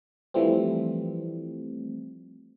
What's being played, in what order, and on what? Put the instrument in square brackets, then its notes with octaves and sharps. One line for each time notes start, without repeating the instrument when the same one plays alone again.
[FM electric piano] E3 F3 G3 A3 C4